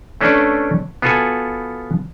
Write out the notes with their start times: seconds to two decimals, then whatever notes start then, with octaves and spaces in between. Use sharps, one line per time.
0.21 A3 C#4 D4 A4 B4 D5
1.02 B3 F4 F#4 A4 F#5 G#5